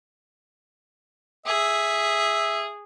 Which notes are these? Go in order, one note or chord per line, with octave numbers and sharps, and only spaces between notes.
G#4 E5